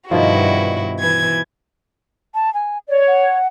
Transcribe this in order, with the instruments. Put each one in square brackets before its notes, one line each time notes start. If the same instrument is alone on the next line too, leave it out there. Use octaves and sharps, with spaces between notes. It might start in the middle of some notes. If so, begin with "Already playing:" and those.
[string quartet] G2 E4 F#4 [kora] B2 D#3 F3
[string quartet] E3 G#6
[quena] A5
G#5
[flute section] C#5 [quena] D5
[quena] F#5